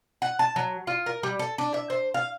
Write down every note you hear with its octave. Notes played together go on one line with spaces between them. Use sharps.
F#5
A5
F#3
F4
A#4
G3
A4
D4
E5
C5
F5